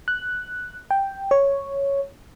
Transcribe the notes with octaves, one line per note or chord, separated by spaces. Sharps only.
F#6
G5
C#5